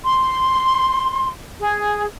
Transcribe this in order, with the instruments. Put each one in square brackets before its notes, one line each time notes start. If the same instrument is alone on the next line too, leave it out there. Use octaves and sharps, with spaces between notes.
[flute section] C6
G#4